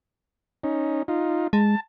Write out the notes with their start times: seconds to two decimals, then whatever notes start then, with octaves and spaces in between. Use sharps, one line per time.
0.64 C#4 D#4
1.08 D#4 F4
1.53 G#3 A5